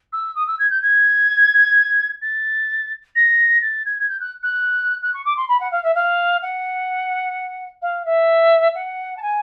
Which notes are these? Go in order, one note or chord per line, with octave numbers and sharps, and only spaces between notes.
E6
D#6
E6
G#6
G6
G#6
A6
A#6
A6
G#6
G#6
G6
F#6
F#6
F#6
C#6
D6
C6
B5
F#5
F5
E5
F5
F#5
F5
E5
F#5
A5
G#5